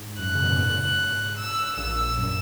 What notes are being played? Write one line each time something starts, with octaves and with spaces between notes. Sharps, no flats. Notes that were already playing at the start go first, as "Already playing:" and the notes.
Already playing: G#2
F#2 F#6
C#3
B2
A#2
G#2
E6
A#1 A#2 E6
F#2